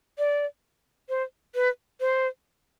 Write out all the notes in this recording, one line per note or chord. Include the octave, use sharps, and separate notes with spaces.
D5
C5
B4
C5